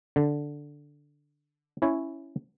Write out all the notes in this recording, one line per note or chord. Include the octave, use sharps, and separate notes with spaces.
D3
C#4 E4 C#5